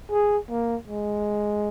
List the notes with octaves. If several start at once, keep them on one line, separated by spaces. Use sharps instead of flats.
G#4
A#3
G#3